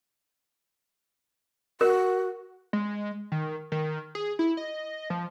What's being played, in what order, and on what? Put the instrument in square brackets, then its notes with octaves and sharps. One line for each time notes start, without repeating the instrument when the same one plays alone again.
[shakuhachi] F#4 [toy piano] A#4
[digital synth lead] G#3
D#3
D#3
G#4
E4
D#5
F3